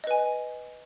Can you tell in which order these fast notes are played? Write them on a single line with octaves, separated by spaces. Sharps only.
D#5 B4 G#5